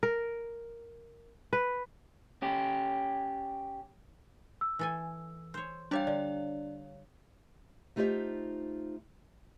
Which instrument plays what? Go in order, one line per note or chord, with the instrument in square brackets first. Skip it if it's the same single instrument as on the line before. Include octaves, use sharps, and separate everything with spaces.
[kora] A#4
B4
[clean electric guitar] C#4 G4
[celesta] E6
[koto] E3 A4 G#5
C5 C#5
[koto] G3 G4 A5 [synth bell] D4 C#5 F5
[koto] D3 [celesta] D5
[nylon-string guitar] A3 D#4 F4 G4 C5 E5